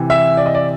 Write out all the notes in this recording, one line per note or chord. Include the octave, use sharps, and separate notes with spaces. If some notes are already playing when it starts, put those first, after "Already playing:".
Already playing: C3 E3
E5
D5
D#5
D5